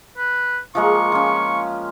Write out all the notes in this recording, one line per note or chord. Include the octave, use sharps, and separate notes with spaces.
B4
F3 G#3 A#3 C#6
F3 C#4